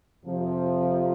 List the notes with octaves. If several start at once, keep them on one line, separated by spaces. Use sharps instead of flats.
F2 C3 F3